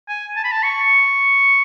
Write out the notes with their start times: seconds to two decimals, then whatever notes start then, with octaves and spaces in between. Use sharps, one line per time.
0.09 G#5
0.36 A5
0.44 B5
0.52 A5
0.63 C#6